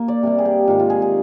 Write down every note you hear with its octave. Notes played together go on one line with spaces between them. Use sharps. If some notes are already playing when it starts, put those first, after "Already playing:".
Already playing: A#3
D5
C3 G3 A#3
G#4
G4
G#2 D#3 G3 F4
F4
G#4
G#4